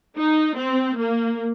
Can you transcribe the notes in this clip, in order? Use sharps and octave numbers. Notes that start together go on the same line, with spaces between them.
D#4
C4
A#3